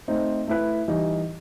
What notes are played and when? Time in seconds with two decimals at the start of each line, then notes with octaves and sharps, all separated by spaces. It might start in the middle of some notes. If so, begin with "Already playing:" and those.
0.08 A3 C4 D#4
0.48 A3 E4 B4
0.88 E3 G3 D#4